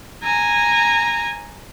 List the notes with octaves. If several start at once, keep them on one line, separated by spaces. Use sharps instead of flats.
G#5 A#5